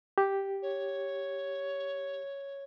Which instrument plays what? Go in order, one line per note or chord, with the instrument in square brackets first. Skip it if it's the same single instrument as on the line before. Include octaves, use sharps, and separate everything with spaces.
[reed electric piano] G4
[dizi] C#5